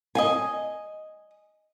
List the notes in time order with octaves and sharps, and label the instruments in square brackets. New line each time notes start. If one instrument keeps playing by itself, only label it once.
[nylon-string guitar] D#5 F5 G#5